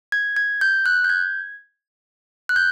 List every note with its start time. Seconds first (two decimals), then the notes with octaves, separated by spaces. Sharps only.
0.12 G#6
0.36 G#6
0.61 G6
0.86 F#6
1.04 G6
1.10 G#6
2.49 F#6
2.56 G6